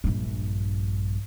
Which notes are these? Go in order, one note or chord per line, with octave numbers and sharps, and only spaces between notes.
A#1 G2